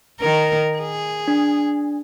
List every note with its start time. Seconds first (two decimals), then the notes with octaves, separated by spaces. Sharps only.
0.20 D#3 A#4
0.78 G#4
1.28 D4